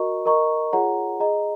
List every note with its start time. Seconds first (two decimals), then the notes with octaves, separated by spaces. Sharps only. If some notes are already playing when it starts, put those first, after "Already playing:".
Already playing: F#4 A#4 D#5 A#5 C#6
0.26 A#4 D#5 A#5 C#6
0.73 F4 G#4 C#5 F#5 A#5
1.20 G#4 D#5 A#5